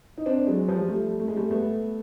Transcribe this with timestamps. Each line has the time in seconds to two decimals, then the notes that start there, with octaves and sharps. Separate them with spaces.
0.18 D#4
0.26 C4 D4
0.47 F#3 G#3
0.68 F3 G3
0.88 G3 A3
1.20 A3
1.28 G#3
1.36 G3 A3
1.51 A3 B3